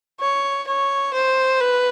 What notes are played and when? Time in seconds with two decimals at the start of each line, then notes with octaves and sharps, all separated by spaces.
0.20 C#5
0.68 C#5
1.13 C5
1.60 B4